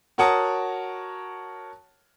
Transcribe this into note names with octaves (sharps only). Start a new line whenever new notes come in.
F#4 A#4 C#5 F#5 A5 D#6